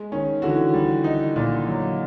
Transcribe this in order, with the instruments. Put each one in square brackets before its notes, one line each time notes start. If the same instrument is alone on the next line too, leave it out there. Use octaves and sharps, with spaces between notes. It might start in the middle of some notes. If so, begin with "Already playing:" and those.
Already playing: [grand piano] G#3
[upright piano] D#3 [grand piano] C#4
[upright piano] D3 E3 [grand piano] F#4
[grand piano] G3
D#4
A#2
F#3